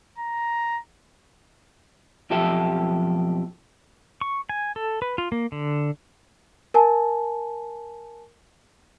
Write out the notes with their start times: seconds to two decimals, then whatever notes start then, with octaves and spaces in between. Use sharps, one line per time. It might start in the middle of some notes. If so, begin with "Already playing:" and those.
0.18 A#5
2.30 B1 F2 F3 G4 A4 E5
4.21 C#6
4.49 G#5
4.76 A4
5.02 B4
5.18 F4
5.32 A#3
5.52 D3
6.74 A#4 G#5 A5